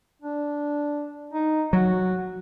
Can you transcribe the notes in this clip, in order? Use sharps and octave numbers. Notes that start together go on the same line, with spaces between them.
D4
D#4
F#3 F#4